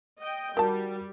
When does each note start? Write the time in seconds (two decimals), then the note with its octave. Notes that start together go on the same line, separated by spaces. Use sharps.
0.20 D#5 G5
0.57 D#3 G3 F#4 A#4 A5